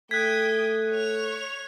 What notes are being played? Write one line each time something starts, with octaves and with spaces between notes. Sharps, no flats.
A3 G5 D#6 F#6 G#6 B6
C#5 F7